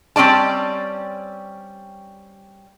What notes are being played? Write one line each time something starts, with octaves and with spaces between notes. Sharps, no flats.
G3 C4 C#4 D5 A5